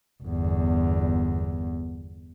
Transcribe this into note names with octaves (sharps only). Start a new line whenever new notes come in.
G1 E2